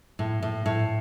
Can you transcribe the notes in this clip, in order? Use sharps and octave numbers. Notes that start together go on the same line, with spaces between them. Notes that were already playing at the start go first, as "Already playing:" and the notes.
A2
A2
A2